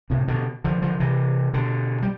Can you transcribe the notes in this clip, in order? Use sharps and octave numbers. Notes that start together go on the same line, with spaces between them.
A2 C3
B2 D3
D3 F3
D3 F3
C3 E3
B2 D3
G3